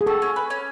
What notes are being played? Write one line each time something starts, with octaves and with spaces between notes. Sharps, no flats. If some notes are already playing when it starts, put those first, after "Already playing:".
G#4
F#4 A4
C#4
B4
C#4